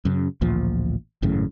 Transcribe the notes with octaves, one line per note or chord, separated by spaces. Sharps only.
F#2 C#3
A1 D2 A#2 F3
G#1 F#2 A2 C#3